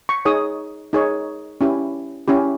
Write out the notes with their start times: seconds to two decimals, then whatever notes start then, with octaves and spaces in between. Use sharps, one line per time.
0.09 C#6
0.25 D#4 G#4 C#5 D#6
0.93 D#4 G#4 C#5
1.61 C#4 E4 G4
2.28 C#4 E4 G4